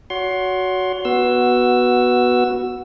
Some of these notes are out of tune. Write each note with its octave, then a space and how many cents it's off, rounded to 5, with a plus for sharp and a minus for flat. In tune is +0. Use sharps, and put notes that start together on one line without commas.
F#4 +0 C#5 +35 C6 +15
B3 -10 F#4 +0 E6 +5